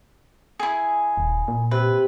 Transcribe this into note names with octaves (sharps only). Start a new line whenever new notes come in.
E4 G#4
D#1
A#2
C3 B4